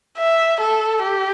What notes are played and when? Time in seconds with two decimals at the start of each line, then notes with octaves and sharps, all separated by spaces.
0.18 E5
0.61 A4
1.03 G4